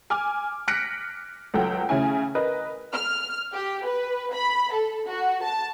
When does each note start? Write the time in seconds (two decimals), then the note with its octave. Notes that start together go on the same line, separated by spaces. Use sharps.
0.10 G#5 D6 F6
0.68 F6 F#6 A#6 B6 C#7 D7
1.54 C#2 F#3 A4 F#5 G5
1.89 C#3 A3 C#4 E4 G#5
2.35 A#4 B4 D#5
2.92 F6
3.53 G4
3.86 B4
4.33 B5
4.72 A4
5.08 F#4
5.42 A5